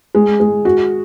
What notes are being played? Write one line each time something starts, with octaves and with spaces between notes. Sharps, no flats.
G#3
G#3
F#4